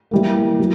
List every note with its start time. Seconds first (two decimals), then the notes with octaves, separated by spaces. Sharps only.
0.11 E3 G3 A#3
0.60 F#3